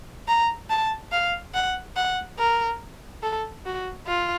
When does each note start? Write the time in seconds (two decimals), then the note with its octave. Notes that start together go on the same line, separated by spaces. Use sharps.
0.28 A#5
0.70 A5
1.12 F5
1.54 F#5
1.96 F#5
2.39 A#4
3.23 A4
3.66 F#4
4.08 F4